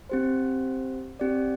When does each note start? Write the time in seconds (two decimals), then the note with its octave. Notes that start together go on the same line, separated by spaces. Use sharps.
0.09 C4 G4 C5
1.20 C4 G4 D5